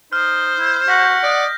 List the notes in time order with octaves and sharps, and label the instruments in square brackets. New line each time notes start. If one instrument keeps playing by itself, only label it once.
[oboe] D#4 [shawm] C5 [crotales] F6
[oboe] E4
[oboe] F#4 [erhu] F#5 [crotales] G6 A#6 B6
[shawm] D5 [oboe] D#5